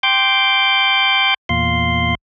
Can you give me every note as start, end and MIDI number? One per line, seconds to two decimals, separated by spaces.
0.03 1.34 79
0.03 1.34 84
0.03 1.34 86
0.03 1.34 91
1.49 2.15 40
1.49 2.15 46
1.49 2.15 77
1.49 2.15 84